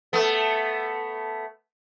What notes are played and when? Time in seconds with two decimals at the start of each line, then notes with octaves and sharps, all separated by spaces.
0.13 A3 B3